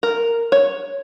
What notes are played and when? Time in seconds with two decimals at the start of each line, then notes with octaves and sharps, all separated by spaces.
0.03 A#4
0.52 C#5